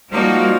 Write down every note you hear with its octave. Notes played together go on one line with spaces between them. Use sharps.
F3 G3 A#3 D#4 F#4